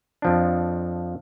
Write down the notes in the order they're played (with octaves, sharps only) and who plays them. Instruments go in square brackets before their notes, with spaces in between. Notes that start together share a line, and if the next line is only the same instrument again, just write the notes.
[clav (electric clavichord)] F2 F3 D4